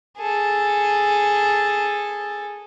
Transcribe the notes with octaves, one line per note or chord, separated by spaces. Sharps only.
G#4 A4